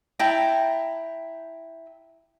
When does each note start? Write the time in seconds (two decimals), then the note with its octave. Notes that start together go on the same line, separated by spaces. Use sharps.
0.19 E4 G5 A5 A#5